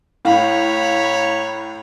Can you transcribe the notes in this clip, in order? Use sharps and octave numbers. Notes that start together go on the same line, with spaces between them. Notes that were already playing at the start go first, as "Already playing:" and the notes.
A2 C#5 F5 A#5 B5